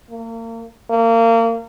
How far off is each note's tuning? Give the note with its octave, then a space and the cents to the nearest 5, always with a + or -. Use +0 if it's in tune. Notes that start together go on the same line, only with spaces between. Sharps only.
A#3 -35
A#3 -30